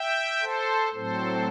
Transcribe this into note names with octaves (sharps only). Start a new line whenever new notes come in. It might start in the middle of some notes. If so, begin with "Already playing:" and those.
Already playing: E5 G5
A4 C5
A2 F#3 C4 A4 C5